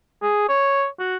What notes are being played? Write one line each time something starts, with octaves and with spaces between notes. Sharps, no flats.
G#4
C#5
F#4